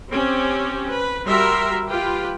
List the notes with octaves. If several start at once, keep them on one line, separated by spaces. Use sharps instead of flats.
C4 C#4 G4
B4
G3 F#4 A#4 E5 A#5 C6
F4 G4 B4 G5